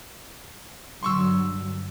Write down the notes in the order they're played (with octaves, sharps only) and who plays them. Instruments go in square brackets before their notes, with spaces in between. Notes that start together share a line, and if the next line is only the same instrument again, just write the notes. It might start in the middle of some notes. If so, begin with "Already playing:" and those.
[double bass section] G2 D3 F#3 [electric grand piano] C6 C#6 E6